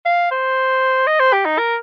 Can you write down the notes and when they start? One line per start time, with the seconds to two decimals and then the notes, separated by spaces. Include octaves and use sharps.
0.05 F5
0.31 C5
1.07 D#5
1.20 C5
1.33 G4
1.45 D#4
1.58 A#4